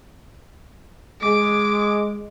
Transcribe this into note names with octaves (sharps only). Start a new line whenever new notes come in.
G#3 D6